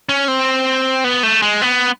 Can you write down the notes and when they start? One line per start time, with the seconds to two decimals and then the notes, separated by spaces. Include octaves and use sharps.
0.09 C#4
0.28 C4
1.04 B3
1.23 A3
1.42 G#3
1.62 B3